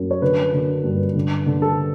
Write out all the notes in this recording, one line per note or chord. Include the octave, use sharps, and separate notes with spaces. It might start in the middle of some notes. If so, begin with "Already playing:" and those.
Already playing: F#2
C#5
D3 B4
D3
G2
D3
D3
A4